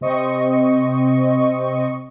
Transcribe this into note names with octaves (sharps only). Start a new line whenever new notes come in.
C3 C4 D#5 C#6